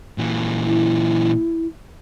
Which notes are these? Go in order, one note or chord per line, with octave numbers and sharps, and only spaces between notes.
A#2 E3
E4